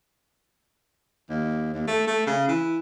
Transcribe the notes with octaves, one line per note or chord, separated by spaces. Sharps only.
D#2
D#2
A3
A3
C#3
E3